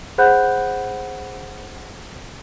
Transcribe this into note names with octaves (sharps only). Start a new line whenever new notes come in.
G#4 C5 F#5 B5 F#6 G6